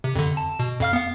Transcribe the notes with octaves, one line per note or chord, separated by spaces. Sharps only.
C3
F2 D3
A5
B2
F2 F5 F6
B3 F5